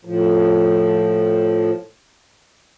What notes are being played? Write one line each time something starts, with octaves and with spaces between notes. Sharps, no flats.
A2 F3